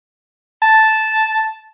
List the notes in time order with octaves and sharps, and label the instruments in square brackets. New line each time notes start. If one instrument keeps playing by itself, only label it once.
[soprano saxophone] A5